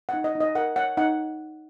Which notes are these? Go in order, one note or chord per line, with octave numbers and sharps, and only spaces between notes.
F#5
D#4
D#5
D#4
D#5
A#4 F#5
C#5 F#5
D#4 F#5